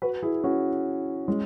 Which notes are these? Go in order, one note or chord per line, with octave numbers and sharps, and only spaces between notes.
F#4 B4
E4 G#4
C#4 F#4
G#3 C#4